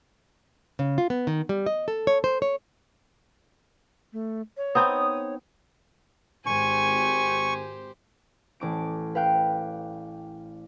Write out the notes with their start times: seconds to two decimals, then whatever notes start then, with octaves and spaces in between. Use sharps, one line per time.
0.79 C#3
0.98 F4
1.10 B3
1.27 D#3
1.49 G3
1.66 D#5
1.88 A4
2.07 C#5
2.24 C5
2.42 C#5
4.13 A3
4.57 C#5
4.75 B3 C4 D#4 D#6
6.46 G#1 G4 C5 G#5 C#6
8.60 A1 D6 D7
9.15 B4 F5 G5 F#6